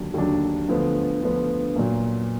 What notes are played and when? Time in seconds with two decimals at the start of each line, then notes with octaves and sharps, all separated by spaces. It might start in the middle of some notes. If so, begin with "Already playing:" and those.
Already playing: D#2 D3 F#3 D4
0.14 D#2 D3 F#3 D4
0.69 D2 D3 F3 B3
1.22 D2 D3 F3 B3
1.76 A#2 F#3 A#3